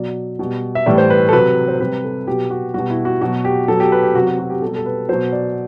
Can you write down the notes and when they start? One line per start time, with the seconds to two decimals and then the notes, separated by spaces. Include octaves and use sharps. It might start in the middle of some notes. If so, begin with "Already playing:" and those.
Already playing: B2 F#3 D5
0.39 B2 G3
0.75 E5
0.86 A2 E3 G3 D5
0.98 C5
1.10 B4
1.29 A4
1.33 C3 F#3 B4
1.68 C5
1.80 C3 G3 B4
2.04 A4
2.27 B2 F#3 G4
2.51 F#4
2.74 B2 G3 F#4
2.90 E4
3.05 F#4
3.21 B2 F#3 F#4
3.45 G4
3.68 B2 F#3 A4
3.80 G4
3.92 B4
4.03 G4
4.15 C3 F#4
4.19 F#3
4.27 F#4
4.39 F#4
4.50 G4
4.62 B2 G3 A4
4.76 A4
4.86 B4
5.09 B2 F#3 C5
5.32 D5